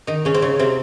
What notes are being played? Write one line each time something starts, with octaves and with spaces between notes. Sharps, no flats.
D#3 D#4
C#3 C#4
C4
C#3 C#4
C3 C4